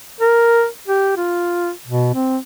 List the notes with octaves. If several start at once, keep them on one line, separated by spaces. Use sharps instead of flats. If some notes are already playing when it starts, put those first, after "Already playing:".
A#4
G4
F4
B2
C4